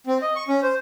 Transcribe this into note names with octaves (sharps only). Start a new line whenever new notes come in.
C4
D#5
C#6
C#4
C5